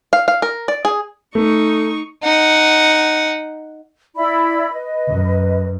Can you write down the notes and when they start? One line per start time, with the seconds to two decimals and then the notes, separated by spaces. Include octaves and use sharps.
0.13 F5
0.28 F5
0.42 A#4
0.68 D5
0.85 G#4
1.35 A3 D#4 C#6
2.23 D#4 F#5
4.16 E4 D5 B5
4.72 B4 D#5
5.09 F#2